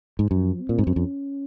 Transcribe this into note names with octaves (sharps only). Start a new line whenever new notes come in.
G#2
F#2 F3
C4
A#2
G#2
F#2
F2 C#4